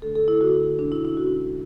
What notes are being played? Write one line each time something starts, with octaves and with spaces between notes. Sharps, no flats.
D3 A3 D4 A4
A4
E4
D3 A3 D4 F#4
B2 G#3 C#4 D4
E4
E4
B2 G#3 C#4 F#4